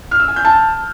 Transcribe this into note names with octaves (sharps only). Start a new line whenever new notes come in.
F6
E6
G#5
G6
A5